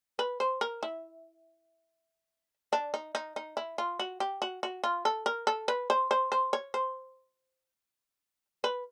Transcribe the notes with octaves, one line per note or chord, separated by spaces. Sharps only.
B4
C5
A#4
E4
D4
D#4
D#4
D#4
E4
F4
F#4
G4
F#4
F#4
F4
A4
A#4
A4
B4
C5
C5
C5
C#5
C5
B4